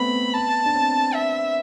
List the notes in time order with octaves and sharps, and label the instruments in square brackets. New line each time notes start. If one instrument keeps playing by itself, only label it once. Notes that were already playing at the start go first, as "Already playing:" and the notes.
Already playing: [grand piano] A3 B3 C4 [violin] B5
[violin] A5
[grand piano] D4
C4
[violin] E5